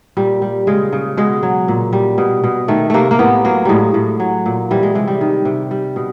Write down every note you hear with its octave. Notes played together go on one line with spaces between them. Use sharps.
A#2 G3
G3
C#3 G#3
C#3
B2 G#3
F#3
A#2
G3
B2
B2
D#3 A3
C3 A3 A#3
A#3
A2 B3
F#3 A#3
A2 G3 G#3
A2
F#3
A#2
E3 G3
G#3
C3 G#3
G3
D#3
C3
G3
B2